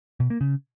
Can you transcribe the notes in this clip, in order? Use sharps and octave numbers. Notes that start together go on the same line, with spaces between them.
B2
A#3
C#3